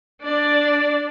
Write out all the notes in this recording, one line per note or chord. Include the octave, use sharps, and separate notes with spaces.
D4 D5